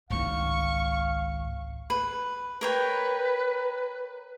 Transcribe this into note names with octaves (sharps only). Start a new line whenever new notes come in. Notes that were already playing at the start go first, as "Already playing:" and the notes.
G#1 C#2 D#4 F5 C#6
B4
A#4 B4 C#5 G5